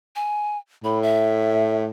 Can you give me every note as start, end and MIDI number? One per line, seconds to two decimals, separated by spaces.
0.16 0.58 80
0.84 1.91 45
0.84 0.99 83
1.03 1.84 76